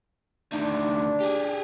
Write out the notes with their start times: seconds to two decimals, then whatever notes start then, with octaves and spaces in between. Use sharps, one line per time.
0.53 D2 D#3 D4
1.21 G4 G#4